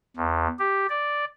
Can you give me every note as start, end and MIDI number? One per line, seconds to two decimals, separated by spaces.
0.17 0.47 40
0.59 0.86 67
0.89 1.25 74